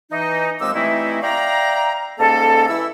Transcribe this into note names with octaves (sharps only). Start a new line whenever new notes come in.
E3 D#4
D#2 F3 G#3 C4 D6 E6
E3 G3 A3 C4 D#4 E4
D5 E5 F5 G5 A#5
G#2 G3 A#3 C#4 A4
E3 E4 E6